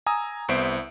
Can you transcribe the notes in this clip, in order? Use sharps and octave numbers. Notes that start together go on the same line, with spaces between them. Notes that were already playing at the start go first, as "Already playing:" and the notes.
G#5 A#5 D#6 E6
C2 B3 C5 E5 D7